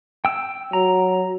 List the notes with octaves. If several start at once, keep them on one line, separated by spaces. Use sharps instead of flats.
G5 E6
F#3 A#5